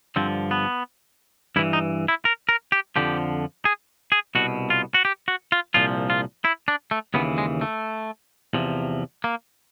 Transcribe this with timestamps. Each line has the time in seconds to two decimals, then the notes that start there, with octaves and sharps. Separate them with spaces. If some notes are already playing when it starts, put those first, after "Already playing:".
0.16 G2 D3 F3 C4
0.51 B3
1.56 G2 E3 E4
1.73 D#4
2.08 E4
2.25 A#4
2.49 A#4
2.72 G4
2.96 F2 D3 F3 G4
3.65 G#4
4.12 G#4
4.35 C2 B2 F#4
4.70 F4
4.94 F#4
5.05 G4
5.28 F#4
5.52 F4
5.74 C2 A#2 F3 F4
6.10 F4
6.45 E4
6.68 D4
6.91 A3
7.14 D#2 C#3 E3 B3
7.38 G#3
7.61 A3
8.53 E2 C3 F3
9.24 A#3